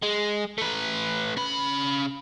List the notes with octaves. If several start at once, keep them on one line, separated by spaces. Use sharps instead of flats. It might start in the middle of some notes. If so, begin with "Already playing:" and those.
G#3
A3 B4
C#3 B5